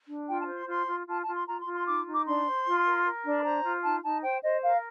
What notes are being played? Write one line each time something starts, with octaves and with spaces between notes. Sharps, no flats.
D4
F4 G5
A5
C5
C6
F4 C6
F4
F4 A5
A5
F4
C6
F4 A#5
C6
F4
C6
D#4 D6
D#4
D6
D4 C6
C5
F4
A#4
A#4
D4
C6
C5 A#5
F4
D#4 A5
D#4 A5
C5 G5
C5 D#5
A#4 F5